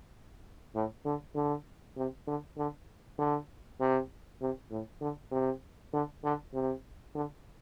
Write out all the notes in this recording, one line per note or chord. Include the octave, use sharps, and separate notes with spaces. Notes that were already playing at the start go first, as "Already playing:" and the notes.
A2
D3
D3
C3
D3
D3
D3
C3
C3
A2
D3
C3
D3
D3
C3
D3